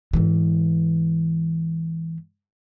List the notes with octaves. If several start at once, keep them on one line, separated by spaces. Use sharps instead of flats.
G#2 E3